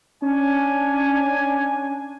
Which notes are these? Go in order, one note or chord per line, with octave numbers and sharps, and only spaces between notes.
C#4 D4 G#5